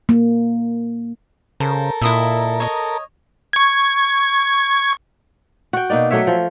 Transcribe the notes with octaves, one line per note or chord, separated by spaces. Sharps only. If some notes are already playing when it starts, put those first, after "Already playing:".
A#3
C#3 A4 A#4 C5
A#2 E4 D#5 E5
C#5 D#5
C#6 G#6
F#4 G5
B2 A#3 D#4 D5
F#3 A3 C#5 E5
F3